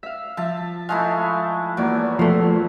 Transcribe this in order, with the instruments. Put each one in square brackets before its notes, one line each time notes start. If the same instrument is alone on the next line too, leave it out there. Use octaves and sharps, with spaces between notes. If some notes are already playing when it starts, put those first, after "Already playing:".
[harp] E5 F5
[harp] F3 [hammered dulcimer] E5 A5
[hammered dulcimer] G#3 A3 E4 [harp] F5
[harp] E2 A#3 D5 [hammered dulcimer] F#3
[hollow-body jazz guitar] F3 A3